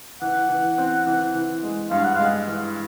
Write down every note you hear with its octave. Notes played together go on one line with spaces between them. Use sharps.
E3 F#5
E3
C4
E3
E3
G#3
G2 F5
F#5
G#3 F5
E3